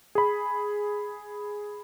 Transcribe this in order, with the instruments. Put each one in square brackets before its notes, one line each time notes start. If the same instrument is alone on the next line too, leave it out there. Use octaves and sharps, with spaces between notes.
[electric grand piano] G#4 B5